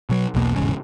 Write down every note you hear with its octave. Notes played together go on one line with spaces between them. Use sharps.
B2 F#3
B1 E2 B2 A#3
E1 A1 G#2 C#3